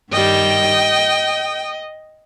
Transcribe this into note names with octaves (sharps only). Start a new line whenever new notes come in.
G2 D#3 G3 D#5 G5